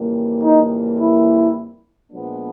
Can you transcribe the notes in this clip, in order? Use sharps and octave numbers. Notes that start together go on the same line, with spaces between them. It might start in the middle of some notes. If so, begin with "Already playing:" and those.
Already playing: F2 C#3 E3 G3 A#3
D#4
E4
A#2 F3 G#3 B3 D4